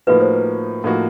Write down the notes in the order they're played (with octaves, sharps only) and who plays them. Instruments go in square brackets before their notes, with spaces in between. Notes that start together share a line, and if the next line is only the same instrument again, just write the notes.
[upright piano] A2 F3 A#3 D#4 F#4 [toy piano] B4
[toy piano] C5
B4
[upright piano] A2 F3 A#3 D#4 F#4